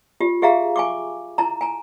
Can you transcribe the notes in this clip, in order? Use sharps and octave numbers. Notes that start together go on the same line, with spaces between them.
F4 G4
G4 G#4 E5 F5 A#5
G#5 C#6 D6
E4 A5 A#5
G#5 A#5